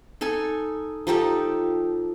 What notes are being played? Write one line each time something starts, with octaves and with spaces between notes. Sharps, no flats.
D#4 A4 G#5
F3 D#4 G4 A4